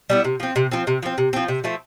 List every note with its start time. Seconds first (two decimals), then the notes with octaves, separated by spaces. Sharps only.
0.10 G3 B3 E4
0.24 C3
0.40 F3 C4
0.56 C3
0.71 F3 C4
0.87 C3
1.03 F3 C4
1.18 C3
1.33 F3 C4
1.48 C3
1.64 F3 A3 C4